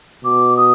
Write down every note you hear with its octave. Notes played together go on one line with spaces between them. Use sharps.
B2 D6
D#6